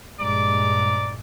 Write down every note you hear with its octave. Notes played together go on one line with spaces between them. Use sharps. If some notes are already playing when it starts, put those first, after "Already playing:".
A#1 G2 G#3 D5 A#5 D6